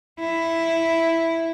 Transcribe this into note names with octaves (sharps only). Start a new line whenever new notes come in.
E4